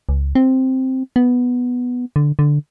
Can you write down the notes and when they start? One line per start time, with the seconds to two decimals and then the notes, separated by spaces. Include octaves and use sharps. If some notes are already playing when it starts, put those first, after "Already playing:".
0.09 C#2
0.35 C4
1.16 B3
2.16 D3
2.39 D3